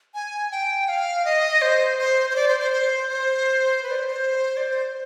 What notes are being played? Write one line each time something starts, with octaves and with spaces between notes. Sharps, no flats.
G#5
G5
F5
D#5
C5
C5
C5
D5
C5
C5
C5
C5
B4
D5
C5
C5
D5
C5